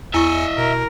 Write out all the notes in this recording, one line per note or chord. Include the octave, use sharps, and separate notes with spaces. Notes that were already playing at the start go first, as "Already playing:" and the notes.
E2 E4 D#5 E5 G#5 C#6 C#7
B2 A#4